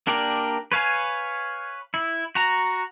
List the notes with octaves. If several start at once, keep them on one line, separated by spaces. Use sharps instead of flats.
A#3 D4 G4 A#4 D5
B4 C#5 F5 G#5
E4
F#4 A#5